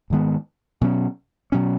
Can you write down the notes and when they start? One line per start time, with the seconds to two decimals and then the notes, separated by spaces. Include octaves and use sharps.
0.10 G#2 D#3 G#3 B3
0.81 B2 F#3 C#4
1.52 B2 F#3 C#4